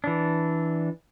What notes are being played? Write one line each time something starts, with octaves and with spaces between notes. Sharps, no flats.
E3 D4